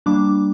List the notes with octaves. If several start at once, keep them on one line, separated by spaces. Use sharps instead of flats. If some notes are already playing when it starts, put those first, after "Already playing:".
G3 A#3 D4 D6